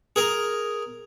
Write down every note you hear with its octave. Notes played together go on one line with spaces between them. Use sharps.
G#4 A#4